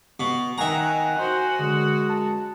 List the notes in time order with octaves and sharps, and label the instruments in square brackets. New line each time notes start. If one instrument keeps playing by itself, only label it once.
[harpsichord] B2
[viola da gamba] D#3 [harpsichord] E5 A#5 [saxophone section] F#5 [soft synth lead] G#5
[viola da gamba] F#4 [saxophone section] C5
[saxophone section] F#2 G#3 [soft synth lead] D3
[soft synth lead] A5